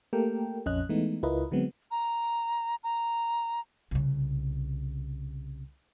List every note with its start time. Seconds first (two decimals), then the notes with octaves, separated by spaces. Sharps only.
0.13 A3 A#3 G4 A4 A#4 G5
0.66 A#1 F2 C#4 D#5 F#6
0.89 E3 G#3 A3 B3 D#4
1.23 C#2 E4 F4 A#4 B4 D#5
1.51 D3 F#3 G#3 B3 C4
1.91 A#5
2.84 A#5
3.91 C2 C#3